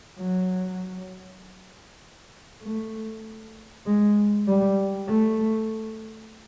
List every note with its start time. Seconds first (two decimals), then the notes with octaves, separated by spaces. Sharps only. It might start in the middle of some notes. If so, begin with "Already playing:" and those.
0.18 F#3
2.63 A3
3.86 G#3
4.48 G3
5.09 A3